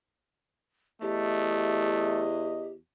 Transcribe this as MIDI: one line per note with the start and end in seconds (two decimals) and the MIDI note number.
1.02 2.77 40
1.02 2.24 57
1.02 2.73 67
1.02 2.71 75